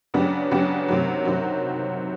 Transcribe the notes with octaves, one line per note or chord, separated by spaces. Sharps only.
C#3 F#3 B3 D4 G4
C#3 F#3 B3 D4 G4
C3 D#3 F#3
C3 D#3 F#3